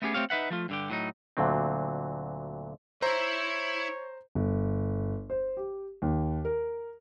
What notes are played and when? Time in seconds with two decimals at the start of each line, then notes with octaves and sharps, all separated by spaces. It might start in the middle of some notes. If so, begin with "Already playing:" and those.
0.02 A3 B3 C#4 G4 G#4
0.14 A3 C4 G4 C#5 F5
0.30 D#4 B4 E5 F#5
0.50 F3 A3 F4
0.69 G2 D3 G4
0.90 A2 F#3 D#4
1.37 D2 A#2 D3 F#3 C4
3.02 E4 C5 C#5 E5 A#5
4.35 G1
5.30 C5
5.57 G4
6.02 D#2
6.45 A#4